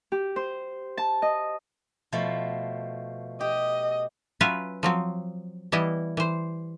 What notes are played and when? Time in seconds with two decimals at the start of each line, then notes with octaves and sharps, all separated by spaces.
0.12 G4
0.36 C5
0.97 A5
1.22 D#5
2.12 B2 F3 A3
3.41 G4 D#5
4.40 F#3 C#4 F4 B4 E5 F5
4.83 F3 F#3 C4
5.72 E3 G3 B3 E4 D#5
6.17 E3 C5